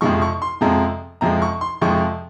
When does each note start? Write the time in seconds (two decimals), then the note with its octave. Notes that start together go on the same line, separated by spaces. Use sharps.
0.01 F2 C3 F3 G#3 C#6
0.22 C#6
0.42 C6
0.61 F2 C3 F3 G#3 A#5
1.21 F2 C3 F3 G#3 A#5
1.42 C#6
1.61 C6
1.81 F2 C3 F3 G#3 C#6